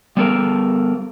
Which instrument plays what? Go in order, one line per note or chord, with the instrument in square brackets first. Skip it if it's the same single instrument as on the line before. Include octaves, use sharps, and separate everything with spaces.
[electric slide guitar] G3 B3 A4 A#4